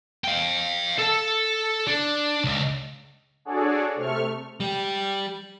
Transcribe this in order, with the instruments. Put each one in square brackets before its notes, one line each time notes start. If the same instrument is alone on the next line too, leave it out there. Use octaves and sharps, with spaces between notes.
[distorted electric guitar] F5 G5
A4 A5
D4
C#2
[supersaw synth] D4 F#4 G#4 A4 C#5 D5
C3 A3 C#6 F6
[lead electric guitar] G3 G4